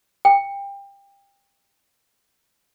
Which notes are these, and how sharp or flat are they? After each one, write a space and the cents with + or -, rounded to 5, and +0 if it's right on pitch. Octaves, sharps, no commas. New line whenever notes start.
G5 +25